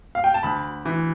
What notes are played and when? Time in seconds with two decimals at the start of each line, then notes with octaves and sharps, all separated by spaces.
0.15 F5
0.24 G5
0.34 A5
0.43 D2 B5
0.85 E3